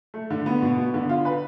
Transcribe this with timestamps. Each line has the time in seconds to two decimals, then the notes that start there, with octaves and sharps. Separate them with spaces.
0.14 A3
0.30 D3
0.46 B3
0.62 B2
0.78 B3
0.94 D3
1.09 F4
1.25 B4